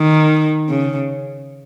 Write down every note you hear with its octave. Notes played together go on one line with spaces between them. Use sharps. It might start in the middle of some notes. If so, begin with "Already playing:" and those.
Already playing: D#3
C#3